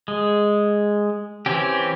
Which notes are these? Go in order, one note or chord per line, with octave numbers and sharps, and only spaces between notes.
G#3
E3 C4 C#4 G4